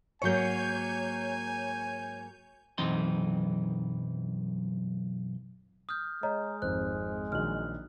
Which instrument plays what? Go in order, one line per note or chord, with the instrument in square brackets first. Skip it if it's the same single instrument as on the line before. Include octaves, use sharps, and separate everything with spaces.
[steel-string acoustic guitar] G#2 F#3 A#3 [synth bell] C#5 G6 [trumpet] G#5
[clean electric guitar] B1 F#2 E3 C4 D#4 C6
[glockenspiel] D#6 F6 G6
[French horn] G#3 [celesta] C#5 D#5 A#5
[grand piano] G#1 F2 [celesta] C5 [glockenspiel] F#6
[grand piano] A#1 D#3 F#3 [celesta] F6 F#7